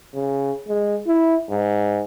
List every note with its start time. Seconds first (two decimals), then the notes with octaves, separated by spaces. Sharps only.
0.14 C#3
0.68 G#3
1.07 E4
1.50 G#2